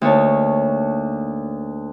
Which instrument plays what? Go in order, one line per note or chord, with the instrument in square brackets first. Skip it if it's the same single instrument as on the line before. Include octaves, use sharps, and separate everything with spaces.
[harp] D2 A#3 D#4 C#5 A5